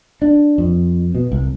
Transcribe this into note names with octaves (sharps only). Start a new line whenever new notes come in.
D4
F2
B2
C2